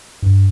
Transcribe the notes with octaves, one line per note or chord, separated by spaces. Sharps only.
G2